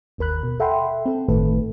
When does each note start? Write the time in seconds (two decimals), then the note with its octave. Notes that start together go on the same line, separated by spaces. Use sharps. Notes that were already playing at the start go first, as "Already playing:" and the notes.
0.18 G1 D#2 A#4 B5 F#6
0.43 B2
0.60 A4 E5 F#5 G5 B5 C6
1.06 C4 A4
1.28 G1 A2 D#3 A3 A4 B4